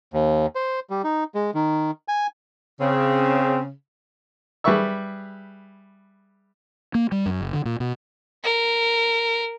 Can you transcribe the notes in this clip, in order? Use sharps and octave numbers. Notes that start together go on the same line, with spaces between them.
D#2
C5
G3
D#4
G#3
D#3
G#5
C#3 C4
G3 G#4 B4 E5 C#6 E6
A#3
G3
F#2
F#1
D3
A#2
B2
A#4